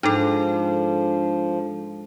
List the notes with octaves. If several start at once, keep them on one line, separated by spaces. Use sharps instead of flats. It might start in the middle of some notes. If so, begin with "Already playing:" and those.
G#2 F3 D4 A4